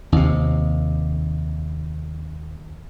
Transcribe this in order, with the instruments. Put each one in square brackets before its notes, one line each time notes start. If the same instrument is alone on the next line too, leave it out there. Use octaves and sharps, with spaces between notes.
[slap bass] D#2 C3